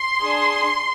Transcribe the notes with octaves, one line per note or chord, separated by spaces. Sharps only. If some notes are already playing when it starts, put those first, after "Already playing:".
Already playing: C6
D4 G#4